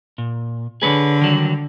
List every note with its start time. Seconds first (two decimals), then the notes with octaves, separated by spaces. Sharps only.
0.18 A#2
0.82 D3 G#4 B4 C#5
1.21 D#3 F#3 G3